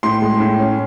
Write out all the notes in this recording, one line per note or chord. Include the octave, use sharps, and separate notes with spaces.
A2 C6
G#3
A2
C#4